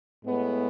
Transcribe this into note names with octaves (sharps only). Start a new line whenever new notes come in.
A2 G#3 B3